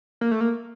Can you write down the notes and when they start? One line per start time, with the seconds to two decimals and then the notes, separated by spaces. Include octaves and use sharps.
0.21 A#3
0.31 A3
0.41 A#3